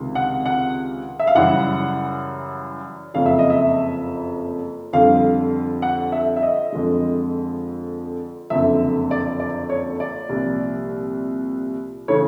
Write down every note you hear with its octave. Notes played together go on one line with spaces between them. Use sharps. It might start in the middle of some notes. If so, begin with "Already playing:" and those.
Already playing: C#2 C3 D#3
F#5
F#5
E5
F5
F#2 C#3 E3 G3 F#5
F#1 F2 C#3 F3 F5
E5
D#5
E5
F2 D3 G3 F5
F#5
E5
E5
D#5
F2 D3 F3 G#3
F#1 F2 D3 E5
D5
D5
C#5
D5
C2 A#2 F3
C#3 E3 A3 C#5